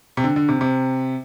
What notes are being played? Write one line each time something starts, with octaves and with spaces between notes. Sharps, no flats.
C3
D3
D3
C3
C3